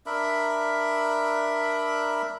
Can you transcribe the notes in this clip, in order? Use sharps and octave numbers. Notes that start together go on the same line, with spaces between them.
D4 A#4 E5 B5